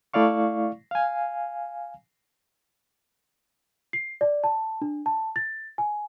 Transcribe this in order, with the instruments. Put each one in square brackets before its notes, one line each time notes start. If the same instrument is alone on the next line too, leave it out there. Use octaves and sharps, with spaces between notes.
[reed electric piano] A3 E4 D5 F5 C#6
F5 G#5
[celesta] C7
D5
A5
D4
A5
A6
G#5